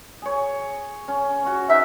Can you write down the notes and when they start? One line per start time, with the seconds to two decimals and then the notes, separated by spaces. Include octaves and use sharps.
0.22 G#4 C#5
1.08 C#4
1.43 F#4 C#5
1.69 D#4 A#4 C5 E5